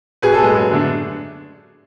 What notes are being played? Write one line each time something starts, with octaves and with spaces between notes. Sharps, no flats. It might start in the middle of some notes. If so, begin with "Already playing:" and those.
B2 G#4 B4
A4
G#3 B3 G#4 B4
F#2
D3 A3 D4